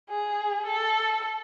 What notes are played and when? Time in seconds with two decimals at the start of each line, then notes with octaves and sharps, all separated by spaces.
0.10 G#4
0.66 A4